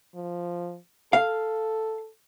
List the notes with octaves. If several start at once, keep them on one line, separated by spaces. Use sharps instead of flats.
F3
A4 F5